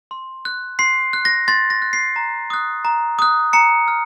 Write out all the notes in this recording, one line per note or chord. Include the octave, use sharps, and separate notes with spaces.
C6
F#6
C6 C7
F#6
A#6
C6 A6
A#6
F#6
C7
A#5
D#6 F#6
A#5
D#6 F#6
A#5 C#7
F6